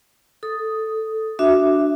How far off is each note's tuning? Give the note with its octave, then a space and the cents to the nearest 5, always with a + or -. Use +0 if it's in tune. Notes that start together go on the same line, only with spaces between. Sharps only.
A4 +0 D#6 +0
D4 +0 F#4 +0 E5 +0